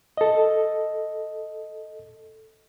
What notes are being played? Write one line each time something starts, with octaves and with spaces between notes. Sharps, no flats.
A4 D#5